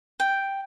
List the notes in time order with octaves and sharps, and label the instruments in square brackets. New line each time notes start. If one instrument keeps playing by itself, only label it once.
[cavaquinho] G5